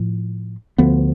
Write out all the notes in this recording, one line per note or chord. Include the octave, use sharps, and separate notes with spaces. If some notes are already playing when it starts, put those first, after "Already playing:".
Already playing: A2 F3
D2 D3 F3 B3